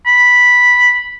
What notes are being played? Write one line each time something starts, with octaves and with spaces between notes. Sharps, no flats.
B5